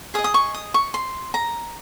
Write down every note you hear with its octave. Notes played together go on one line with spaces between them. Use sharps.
G#4 D#5 D#6
D#6
C#6
D#6
C#6
C6
A#5